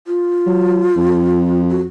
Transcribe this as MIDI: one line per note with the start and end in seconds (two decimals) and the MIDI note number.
0.07 1.63 65
0.47 0.90 54
0.97 1.86 41
1.70 1.82 66